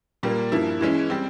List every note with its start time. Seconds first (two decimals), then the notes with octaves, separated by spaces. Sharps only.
0.23 A#2 G3 A#3
0.52 G2 F3 A#3 E4
0.81 E3 G#3 C#4 E4
1.10 G3 C4